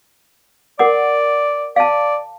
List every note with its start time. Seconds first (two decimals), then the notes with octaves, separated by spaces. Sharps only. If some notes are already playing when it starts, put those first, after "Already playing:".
0.79 A#4 D5 F#5 D6
1.76 D5 F5 A5